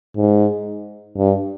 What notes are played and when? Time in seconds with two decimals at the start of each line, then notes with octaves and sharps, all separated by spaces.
0.16 G#2
1.17 G2